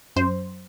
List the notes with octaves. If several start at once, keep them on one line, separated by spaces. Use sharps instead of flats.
F#2 C5